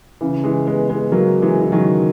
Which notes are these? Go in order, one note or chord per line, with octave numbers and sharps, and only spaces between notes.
C#3 E3
E3 G#3
G#3 B3
G#3 B3
F#3 A#3
E3 G#3
E3
D#3 F#3